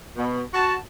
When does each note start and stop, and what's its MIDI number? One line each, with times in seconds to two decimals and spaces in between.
0.17 0.42 47
0.54 0.76 66
0.54 0.76 81